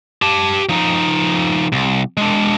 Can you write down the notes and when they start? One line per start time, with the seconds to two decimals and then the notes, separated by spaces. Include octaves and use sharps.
0.22 G4 A5
0.69 F3 D#4
1.73 C2
2.17 G#3 D4